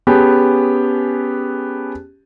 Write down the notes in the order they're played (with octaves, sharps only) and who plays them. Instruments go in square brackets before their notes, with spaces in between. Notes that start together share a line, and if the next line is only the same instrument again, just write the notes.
[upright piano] B3 C#4 G4 G#4 A5